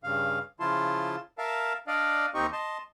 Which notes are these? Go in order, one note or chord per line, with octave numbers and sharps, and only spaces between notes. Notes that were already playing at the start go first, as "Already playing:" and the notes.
G2 C#3 F5
C#3 F3 E4 F4 A5 C6
A#4 E5 F5 A5
D4 D5 D#5 F5
D#2 C4 D#4 G4 D#5 C#6
D#5 A5 C6